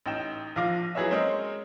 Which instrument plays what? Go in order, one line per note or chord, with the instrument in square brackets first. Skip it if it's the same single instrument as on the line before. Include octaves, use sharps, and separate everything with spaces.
[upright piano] A1 D#4 G5 E7
A#1 F3 F5 D6 A#6
F#3 E4 G#4 B4 C#5 E5
G#3 C4 C#4 A#4 C#5 D#5